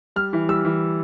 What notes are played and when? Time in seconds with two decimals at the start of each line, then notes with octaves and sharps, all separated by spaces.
0.16 G3 F6
0.33 E3
0.49 G3 E6
0.65 E3